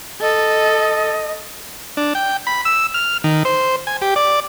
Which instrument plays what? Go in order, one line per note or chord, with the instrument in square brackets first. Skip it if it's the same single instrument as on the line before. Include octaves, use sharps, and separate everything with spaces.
[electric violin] A4 [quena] D#5
[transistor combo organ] D4
G5
B5
E6
F6
D#3
C5
G#5
G4
D5